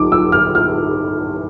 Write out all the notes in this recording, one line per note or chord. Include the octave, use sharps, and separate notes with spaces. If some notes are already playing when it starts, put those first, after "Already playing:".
Already playing: B1 D6
E6
F6
F6